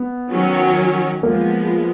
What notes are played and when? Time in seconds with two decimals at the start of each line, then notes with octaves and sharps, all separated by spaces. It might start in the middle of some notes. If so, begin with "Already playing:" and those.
Already playing: B3
0.30 D#3 F#3 C#4
1.23 F3 G#3 A#3 B3